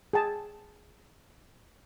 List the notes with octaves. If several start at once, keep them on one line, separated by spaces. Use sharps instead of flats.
G#4 G5 A5